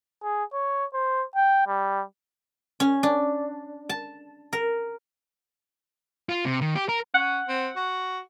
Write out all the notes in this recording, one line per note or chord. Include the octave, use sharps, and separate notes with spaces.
G#4
C#5
C5
G5
G3
C#4
D4
A5
A#4
F4
C3
D#3
G4
A#4
C#4 F#5
C4
F#4